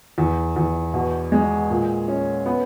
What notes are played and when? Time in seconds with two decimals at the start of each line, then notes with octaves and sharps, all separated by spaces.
0.18 E2
0.56 E2
0.94 B2
1.32 G#3
1.70 A#2
2.08 C#4
2.46 B3